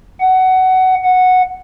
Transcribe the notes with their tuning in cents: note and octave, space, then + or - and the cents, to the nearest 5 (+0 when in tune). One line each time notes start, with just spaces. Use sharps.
F#5 +15
F#5 -10